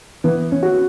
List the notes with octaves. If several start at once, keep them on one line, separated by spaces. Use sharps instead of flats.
E3 B3
C#4
F#4